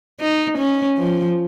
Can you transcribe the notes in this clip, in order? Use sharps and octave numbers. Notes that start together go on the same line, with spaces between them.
D#4
C#4
F3